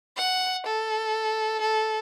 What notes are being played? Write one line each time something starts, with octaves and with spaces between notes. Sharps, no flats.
F#5
A4
A4